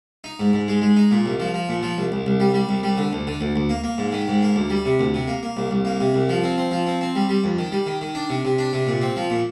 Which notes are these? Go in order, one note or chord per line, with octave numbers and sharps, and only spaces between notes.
D#4
G#2
G#2
G#3
G#3
D#4
A#2
C2
F3
F3
A#2
F3
C2
C2
C2
G3
G3
C2
G3
D3
D2
D3
D2
D2
A#3
A#3
G#2
D#3
G#2
A#3
D2
G3
C3
D2
C3
A#3
A#3
C2
C2
A#3
C3
C2
F3
C4
C4
F3
C4
C4
G3
G3
F2
D#3
G3
D#3
D#3
D4
C3
C3
D4
C3
A#2
C4
F3
A#2